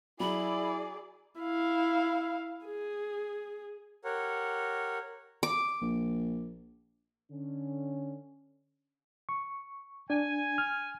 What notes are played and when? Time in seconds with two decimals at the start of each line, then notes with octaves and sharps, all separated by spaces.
0.20 F#3 E4 G#4 D5 B5
1.40 E4 F5
2.66 G#4
4.05 G4 A#4 C#5 F#5
5.43 D6
5.81 A#1
7.31 D3 C#4
9.29 C#6
10.10 D4 G#5
10.58 F6